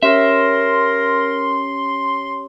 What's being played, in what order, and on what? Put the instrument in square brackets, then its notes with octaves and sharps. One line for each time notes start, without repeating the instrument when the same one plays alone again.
[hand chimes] C#4 G4 C#5 [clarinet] A#4 [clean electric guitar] E5 [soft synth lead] C6